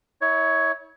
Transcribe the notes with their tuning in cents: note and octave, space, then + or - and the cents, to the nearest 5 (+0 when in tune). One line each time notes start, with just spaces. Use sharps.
E4 -35 C#5 +10